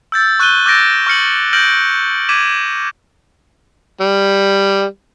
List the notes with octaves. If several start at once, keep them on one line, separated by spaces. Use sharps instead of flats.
E6 G6 A6
C#6 F#6 G6 D#7 G7
D6 E6 G6 A6 A#6 D7
C#6 F6 C#7 F#7
F6 G6 A#6 D7 F#7
D6 G#6 B6 D#7 E7
G3